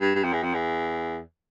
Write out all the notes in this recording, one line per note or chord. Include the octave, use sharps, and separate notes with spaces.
G2
G2
F2
E2
F2
E2